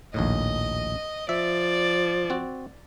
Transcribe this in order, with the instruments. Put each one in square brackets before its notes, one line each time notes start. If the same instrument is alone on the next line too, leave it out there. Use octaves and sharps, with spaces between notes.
[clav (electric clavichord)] A#1 D#2 A2 [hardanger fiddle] D#5
[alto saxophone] F3 [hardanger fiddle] D5 [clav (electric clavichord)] E5
[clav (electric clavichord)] C4 F#4